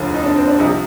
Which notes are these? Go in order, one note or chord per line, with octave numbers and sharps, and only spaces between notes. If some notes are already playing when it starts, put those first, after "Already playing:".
Already playing: F1 D#2 D3 F3
D#4
D4
C4
D4
C2 C3 F3 D#4